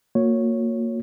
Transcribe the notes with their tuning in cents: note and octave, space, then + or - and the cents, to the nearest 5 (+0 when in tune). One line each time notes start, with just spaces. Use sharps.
A#3 -15 F#4 -35 C#5 +0